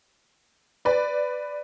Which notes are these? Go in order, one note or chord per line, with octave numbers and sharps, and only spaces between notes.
B4 D5